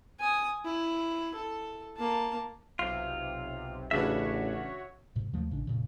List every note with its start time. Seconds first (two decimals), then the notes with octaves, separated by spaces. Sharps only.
0.20 G#5 D#6
0.65 E4
1.35 A4
1.97 A#3 A5
2.79 B1 C3 F4
3.91 A1 C#3 D4 F#4 B4 C#5 E5
5.16 G#2 C3
5.33 D#2 F3 A3
5.51 A1 C#3 D4
5.67 F1 A#2 C#3